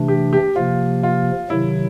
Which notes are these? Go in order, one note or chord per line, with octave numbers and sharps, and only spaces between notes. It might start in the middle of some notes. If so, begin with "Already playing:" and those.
Already playing: C3 E3 A3 D4
G4
G4
C3 F3 A#3 F4
F4
C3 D#3 F#3 E4